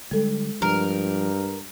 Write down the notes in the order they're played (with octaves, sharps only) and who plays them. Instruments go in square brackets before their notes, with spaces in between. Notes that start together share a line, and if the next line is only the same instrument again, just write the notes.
[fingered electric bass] D3 G3 [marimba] G#3 A4
[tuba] G2 [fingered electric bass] F3 [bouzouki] A#4